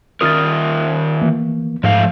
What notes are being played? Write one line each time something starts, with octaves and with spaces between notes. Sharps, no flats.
D#3 F4 A#4 D#6 F6 A6
E3 A#3
G#2 F3 A3 F5